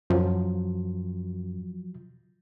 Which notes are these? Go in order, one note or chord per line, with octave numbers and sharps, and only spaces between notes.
F#2 F3 F#3